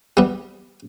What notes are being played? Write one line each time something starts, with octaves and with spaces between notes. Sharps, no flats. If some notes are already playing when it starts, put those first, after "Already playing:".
G3 B3